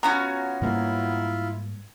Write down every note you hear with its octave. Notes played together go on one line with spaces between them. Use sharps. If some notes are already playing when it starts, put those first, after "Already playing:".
B3 C#4 F4 F#4 A#5 B5 G#6
G#2 G3 A#3 E4 F4